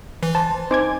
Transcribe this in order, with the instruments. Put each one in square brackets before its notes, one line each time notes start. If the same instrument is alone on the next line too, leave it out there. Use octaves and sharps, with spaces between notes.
[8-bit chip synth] E3
[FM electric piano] C5 [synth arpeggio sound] A5
[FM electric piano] C4 D#4 G#5 [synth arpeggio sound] C5 D6 G#6